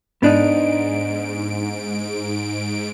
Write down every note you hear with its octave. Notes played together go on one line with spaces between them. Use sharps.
G#2 B3 D4 D#4 D7